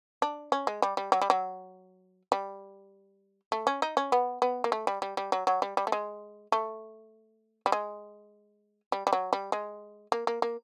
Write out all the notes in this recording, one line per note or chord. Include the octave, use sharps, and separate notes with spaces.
D4
C#4
G#3
G3
G3
F#3
G3
F#3
G3
A3
C#4
D#4
C#4
B3
B3
A#3
A3
G3
G3
G3
F#3
F#3
G3
G3
A3
G#3
A3
G3
G#3
G3
G3
F#3
G3
G#3
A#3
A#3
A#3